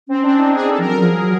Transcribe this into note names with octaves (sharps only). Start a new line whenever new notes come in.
C4 C#4
D4
D#4
G#4
A4
F3 A#4
F#3
A#4
F3 G#4
F#3